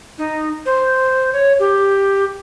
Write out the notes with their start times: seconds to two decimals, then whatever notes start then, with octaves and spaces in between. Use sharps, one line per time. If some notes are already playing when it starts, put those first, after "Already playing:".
0.18 D#4
0.65 C5
1.33 C#5
1.59 G4